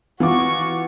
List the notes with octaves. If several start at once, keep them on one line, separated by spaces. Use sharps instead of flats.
E3 F4 F#4 C#6 D6